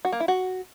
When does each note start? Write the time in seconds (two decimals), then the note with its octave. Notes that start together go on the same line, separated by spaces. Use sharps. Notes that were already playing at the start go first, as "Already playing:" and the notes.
0.05 F#4
0.12 A#3
0.20 E4
0.28 F#4